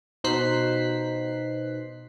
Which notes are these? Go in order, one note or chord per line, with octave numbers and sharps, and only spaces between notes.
B2 D#4 C5 F#6 B6 C7